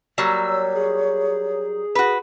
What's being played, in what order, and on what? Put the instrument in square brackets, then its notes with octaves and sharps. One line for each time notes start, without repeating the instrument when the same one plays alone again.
[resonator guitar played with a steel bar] F#3 G3 A#3 [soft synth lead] E6
[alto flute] C#5
[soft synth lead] G#4
[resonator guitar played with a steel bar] F#4 B4